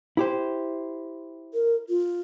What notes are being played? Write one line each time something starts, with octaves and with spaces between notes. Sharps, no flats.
E4 G4 C5
A#4
F4